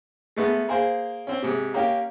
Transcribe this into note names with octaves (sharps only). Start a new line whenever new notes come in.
G#3 A3 B3
A#3 G#4 C5
C4 C#4
G#2 C3
A#3 C#4 G4